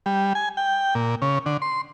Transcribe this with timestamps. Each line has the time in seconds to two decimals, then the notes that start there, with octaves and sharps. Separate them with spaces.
0.06 G3
0.35 G#5
0.57 G5
0.95 A#2
1.22 C#3
1.46 D3
1.62 C6